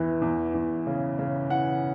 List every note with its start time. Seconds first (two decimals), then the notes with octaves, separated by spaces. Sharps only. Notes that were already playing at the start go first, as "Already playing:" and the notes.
Already playing: E2 E3
0.21 E2
0.54 E2
0.87 C#3
1.19 C#3
1.50 E3 F#5